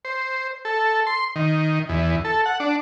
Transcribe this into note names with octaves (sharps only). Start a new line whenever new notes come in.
C5
A4
C6
D#3
E2
A4
F#5
D4